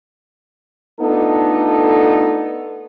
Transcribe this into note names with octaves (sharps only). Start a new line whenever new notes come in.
A3 B3 D4 D#4 F4 A4